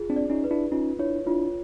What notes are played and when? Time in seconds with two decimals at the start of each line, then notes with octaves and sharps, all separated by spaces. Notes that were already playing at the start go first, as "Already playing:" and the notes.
Already playing: F4 G#4
0.10 C4 D4
0.16 D5
0.30 C#4 D#4
0.44 B4
0.51 D4 E4
0.72 C#4 D#4 F4
0.99 D4 E4 C#5
1.26 D4 E4 F4